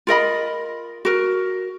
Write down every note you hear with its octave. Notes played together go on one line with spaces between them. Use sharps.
F4 A#4 D#5 B5
F#4 A#4